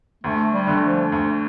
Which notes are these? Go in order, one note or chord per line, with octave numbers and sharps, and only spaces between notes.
D2 A3
G3
D3 A3
F3
D2